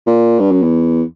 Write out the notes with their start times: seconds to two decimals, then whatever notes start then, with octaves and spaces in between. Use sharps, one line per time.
0.06 A#2
0.39 G2
0.51 F#2
0.62 E2